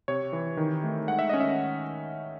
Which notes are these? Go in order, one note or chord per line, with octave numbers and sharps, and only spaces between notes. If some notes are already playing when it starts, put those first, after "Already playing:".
C3 C#5
E3
D#3
A3
G#3 F#5
E5
C#4 D#5
E5